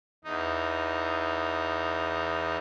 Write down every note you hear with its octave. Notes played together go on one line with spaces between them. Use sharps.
E2 D#4